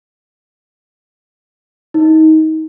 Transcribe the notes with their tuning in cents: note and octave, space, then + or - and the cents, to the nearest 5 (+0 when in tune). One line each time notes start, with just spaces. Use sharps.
D#4 +20